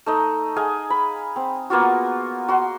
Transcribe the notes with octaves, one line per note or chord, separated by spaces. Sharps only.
A3 D#4 D#5
G#4 D#5 F5 G#5
B5
C4
A#3 B3 F4 F#4
F#4 C6